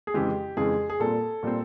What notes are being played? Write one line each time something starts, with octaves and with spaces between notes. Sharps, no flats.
G#4
F2 C#3 E3 G#3 G4
F2 C#3 E3 G#3 G#4
G#4
A#2 G3 C4 A4
A#2 G3 C4